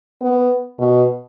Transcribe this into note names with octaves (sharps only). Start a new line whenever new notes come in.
B3
B2